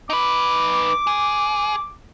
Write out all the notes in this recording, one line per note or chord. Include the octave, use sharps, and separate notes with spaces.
D#4 B4 D6
G#4